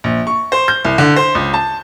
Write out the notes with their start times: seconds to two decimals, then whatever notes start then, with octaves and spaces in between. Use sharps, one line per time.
0.04 A#1
0.27 C#6
0.52 C5
0.68 G6
0.85 C2
0.98 D3
1.16 C5
1.35 C#2
1.54 A5